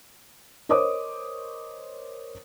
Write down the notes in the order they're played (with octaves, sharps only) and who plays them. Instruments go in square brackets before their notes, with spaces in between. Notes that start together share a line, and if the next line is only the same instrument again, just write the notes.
[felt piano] A#4 C5 C#5 D#5 D6 D#6